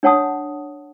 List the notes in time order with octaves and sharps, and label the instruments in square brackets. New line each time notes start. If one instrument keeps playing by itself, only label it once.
[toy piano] D4 C#5 F#5 A5 D#6